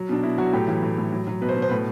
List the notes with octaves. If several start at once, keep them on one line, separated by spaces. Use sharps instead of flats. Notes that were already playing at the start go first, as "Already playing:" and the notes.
Already playing: F#3
B2 D4
B2 E4
F#3 F#4
A2 G4
E3
A2
A2
F#3
F#3
B2 B4
C5
B2 B4
C5
A2 B4